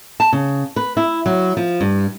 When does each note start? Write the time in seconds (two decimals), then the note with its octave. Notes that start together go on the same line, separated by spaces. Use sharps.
0.20 A5
0.33 C#3
0.76 B4
0.97 E4
1.26 F#3
1.57 F3
1.81 G2